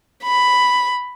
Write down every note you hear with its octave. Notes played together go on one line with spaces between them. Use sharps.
B5